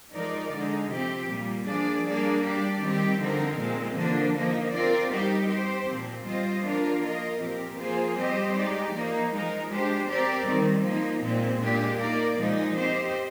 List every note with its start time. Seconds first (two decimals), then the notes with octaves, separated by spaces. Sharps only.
0.13 F3 G#3 D#4 A#4 D5
0.51 D3 G#3 D#4
0.89 C3 F3 C4 G4
1.28 A#2 G3 A#3
1.65 F3 A#3 D4 G#4 D5
2.03 G3 A#3 D4 G#4 D5
2.42 G3 D4 G4 D5
2.80 D#3 G3 C4 G4
3.19 D3 F3 C4 D#4 A#4
3.56 A#2 G#3 C4
3.95 D3 F3 A#3 D4
4.34 F3 A#3 D#4 A#4
4.72 C4 F4 A#4 D5
5.10 G3 C4 D#4 G4 A#4
5.48 C4 G4 C5
5.87 A#2 F3 C4
6.25 G3 C4 F4 C5 D#5
6.63 F3 A#3 D4 F4 A#4
7.01 A#3 F4 A#4 D#5
7.40 A#2 F3 C4 G4 A#4
7.77 F3 A#3 F4 G#4 C5
8.16 G3 C4 G4 C5 D#5
8.54 G#3 D#4 G4 D5
8.92 F3 A#3 D#4
9.30 F3 G#3 D#4 A#4
9.69 G#3 D4 G4 C5
10.08 C4 G4 A#4 D5
10.46 D#3 G3 C4
10.85 F3 A#3 D#4
11.23 A#2 G#3 C4
11.60 A#2 G#3 D4 G4
11.98 A#3 D#4 A#4 D5
12.36 A#2 F3 G#3 D#4
12.75 C4 G4 C5 D#5